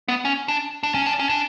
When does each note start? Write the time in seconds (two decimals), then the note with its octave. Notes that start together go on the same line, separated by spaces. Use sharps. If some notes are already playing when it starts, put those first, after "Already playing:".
0.08 B3
0.25 C#4
0.48 D4
0.83 D4
0.94 C#4
1.06 D4
1.19 C#4
1.29 D4